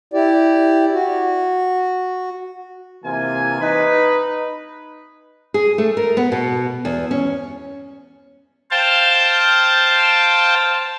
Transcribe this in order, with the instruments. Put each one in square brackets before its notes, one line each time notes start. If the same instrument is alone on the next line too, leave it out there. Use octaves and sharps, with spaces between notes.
[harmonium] E4 G4 D5
F#4
[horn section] C3 E3 A#3 F4 G#5
D#4 B4
[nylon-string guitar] G#4
A3
A#4
B3
B2
E2
C#4
[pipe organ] C5 F5 G5 A5